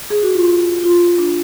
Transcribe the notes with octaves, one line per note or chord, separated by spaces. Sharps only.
G#4
F#4
F4
F4
D4